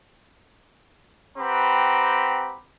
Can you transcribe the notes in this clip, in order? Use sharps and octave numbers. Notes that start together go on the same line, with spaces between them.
C4 G4 B4 F#5 A#5 B5